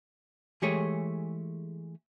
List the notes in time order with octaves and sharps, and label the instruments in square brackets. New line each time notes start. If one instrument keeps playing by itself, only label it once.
[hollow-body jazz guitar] E3 G#3 A3 G4 G#4 C#5